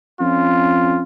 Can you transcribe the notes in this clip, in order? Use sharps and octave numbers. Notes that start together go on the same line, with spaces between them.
F2 C#4 F4